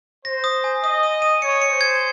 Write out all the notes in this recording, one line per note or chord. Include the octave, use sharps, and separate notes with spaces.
C5 A#6
D#6
G#5
D#5 D#6
D#6
D#7
C#5 C#7
C#7
C5
G#6